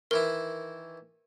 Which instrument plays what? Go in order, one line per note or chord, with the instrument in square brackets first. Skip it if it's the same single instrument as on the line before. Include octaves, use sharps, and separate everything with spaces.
[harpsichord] D#3 E3 E4 [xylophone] A#4